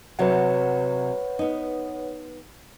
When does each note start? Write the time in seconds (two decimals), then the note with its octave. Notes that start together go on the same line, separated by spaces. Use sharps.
0.19 C3 F#3 B4 C#5 F#5
1.39 B3 D#4